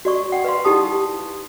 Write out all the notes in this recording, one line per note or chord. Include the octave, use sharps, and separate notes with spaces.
F#4 D5 C#6
F#5 G5
B4 D5 F5 C6
D#4 E4 G4 A5 D#6